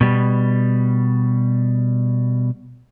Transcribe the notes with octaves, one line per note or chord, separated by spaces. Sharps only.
B2 G3